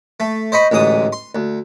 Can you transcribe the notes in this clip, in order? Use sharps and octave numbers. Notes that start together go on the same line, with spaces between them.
A3
C5 D#5 B5 C#6
A1 D2 G#2 D#6
C6
D2